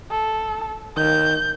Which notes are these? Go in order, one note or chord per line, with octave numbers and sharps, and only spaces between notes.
A4
D#3 G6